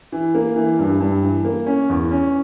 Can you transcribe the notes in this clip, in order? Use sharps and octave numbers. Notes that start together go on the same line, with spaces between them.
E3
A#3
E3
G2
G2
E3
A#3
C#4
E2
C#4